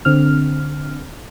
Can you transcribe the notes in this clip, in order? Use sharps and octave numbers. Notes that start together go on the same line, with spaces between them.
D3 C4 F6